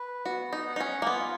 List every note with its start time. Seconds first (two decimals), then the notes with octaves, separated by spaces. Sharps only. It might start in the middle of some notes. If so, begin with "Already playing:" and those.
Already playing: B4
0.26 B3 F#4
0.53 D#4
0.67 F#5
0.76 D#4
0.80 C#4
1.02 A#3
1.07 B3 F4